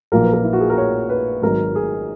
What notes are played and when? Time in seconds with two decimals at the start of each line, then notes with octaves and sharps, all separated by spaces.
0.12 A#1 A#2 F#3 A#3 A#4
0.23 B4
0.33 A#4
0.44 E4
0.53 F#4
0.60 G#4
0.70 A#4
0.78 C#5
1.09 B4
1.42 G#1 G#2 D#3 F#3 A#4
1.75 G#4